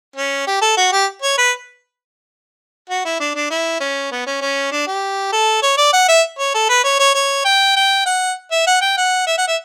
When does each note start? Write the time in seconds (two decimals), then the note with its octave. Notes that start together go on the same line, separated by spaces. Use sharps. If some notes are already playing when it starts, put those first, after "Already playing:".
0.16 C#4
0.47 G4
0.62 A4
0.77 F#4
0.92 G4
1.22 C#5
1.38 B4
2.89 F#4
3.05 E4
3.20 D4
3.35 D4
3.50 E4
3.80 C#4
4.11 B3
4.26 C#4
4.41 C#4
4.72 D4
4.87 G4
5.32 A4
5.62 C#5
5.77 D5
5.93 F#5
6.08 E5
6.38 C#5
6.54 A4
6.69 B4
6.84 C#5
6.99 C#5
7.14 C#5
7.45 G5
7.76 G5
8.06 F#5
8.51 E5
8.67 F#5
8.81 G5
8.97 F#5
9.26 E5
9.38 F#5
9.47 E5